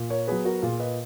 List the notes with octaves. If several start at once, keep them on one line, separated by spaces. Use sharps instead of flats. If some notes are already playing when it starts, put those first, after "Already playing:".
Already playing: A#2
A#4 C#5
F#3 B3 G#4 B4
F#4 A#4
A#2 F4 G#4
B4 D#5